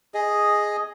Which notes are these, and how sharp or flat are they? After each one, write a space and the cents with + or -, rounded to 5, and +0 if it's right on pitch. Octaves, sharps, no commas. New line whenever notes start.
G#4 +0 D#5 +0